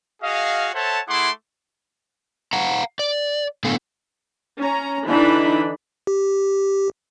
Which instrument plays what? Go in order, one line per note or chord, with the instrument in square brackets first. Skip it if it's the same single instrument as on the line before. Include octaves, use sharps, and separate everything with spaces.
[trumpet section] F#4 G#4 D#5 F5
A4 C5 C#5 E5 F#5 A5
A3 E4 G#4 F#5 C6 D6
[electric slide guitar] F5 F#5 A#5
D5
A2 D3 B3 A4 F5 G#5
[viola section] C#4 A#5
D3 E3 D4 D#4 B5
[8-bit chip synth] G4